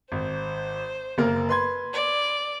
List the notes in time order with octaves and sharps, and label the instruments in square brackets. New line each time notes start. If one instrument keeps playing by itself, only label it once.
[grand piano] G#1 [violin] C5
[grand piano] F#1 A#3 A#4
B4 C6 G#6
[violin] D5